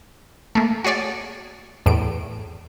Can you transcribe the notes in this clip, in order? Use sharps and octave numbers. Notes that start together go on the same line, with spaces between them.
A3 A#3
F#4 G#4 C#5 D5
E2 A2 D7